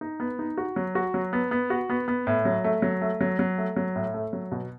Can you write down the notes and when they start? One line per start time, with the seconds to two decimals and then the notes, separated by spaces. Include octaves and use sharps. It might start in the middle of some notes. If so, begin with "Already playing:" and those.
0.01 D#4
0.20 B3
0.39 D#4
0.58 F#4
0.76 F#3
0.95 F#4
1.14 F#3
1.33 B3
1.51 B3
1.70 F#4
1.90 B3
2.08 B3
2.27 A2
2.45 F#3
2.64 A3
2.82 F#3
3.01 A3
3.21 F#3
3.39 F#3
3.58 A3
3.76 F#3
3.96 A2
4.14 A3
4.33 F#3
4.52 B2